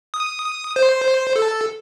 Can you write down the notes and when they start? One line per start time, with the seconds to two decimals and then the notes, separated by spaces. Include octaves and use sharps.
0.14 D#6
0.76 C5
1.36 A4